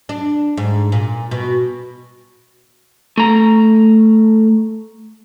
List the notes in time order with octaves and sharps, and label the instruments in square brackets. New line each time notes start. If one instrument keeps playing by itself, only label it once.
[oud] D4
G#2
A#2
B2
[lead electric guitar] A3 A#5